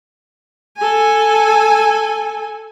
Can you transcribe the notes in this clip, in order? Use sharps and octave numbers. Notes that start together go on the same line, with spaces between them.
A4 G#5